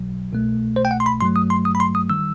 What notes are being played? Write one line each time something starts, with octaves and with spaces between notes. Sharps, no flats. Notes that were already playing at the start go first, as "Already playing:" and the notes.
Already playing: B1 B2 F#3
C2 B2 A3
C5
G5
F#5
C6
B5
G2 F#3 A3 C6
D#6
C6
D#6
B5
C6
D#6
D#3 G3 E6